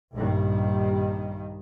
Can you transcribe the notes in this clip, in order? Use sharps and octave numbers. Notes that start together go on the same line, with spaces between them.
A#1 G2 D#3 G3